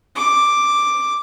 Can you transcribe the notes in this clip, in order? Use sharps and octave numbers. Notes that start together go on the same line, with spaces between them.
D6